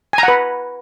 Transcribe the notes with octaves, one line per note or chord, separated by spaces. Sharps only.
B4 F#5 G#5 A#5